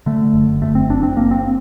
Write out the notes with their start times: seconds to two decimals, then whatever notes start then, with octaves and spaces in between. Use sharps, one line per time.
0.06 D3 A3
0.33 F#1
0.62 F#1 A3
0.75 C4
0.89 F#1 D4
1.03 C4
1.17 F#1 A#3
1.31 C4